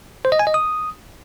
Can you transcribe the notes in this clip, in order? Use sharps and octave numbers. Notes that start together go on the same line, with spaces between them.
C5
D#5
G#5
D#5
D#6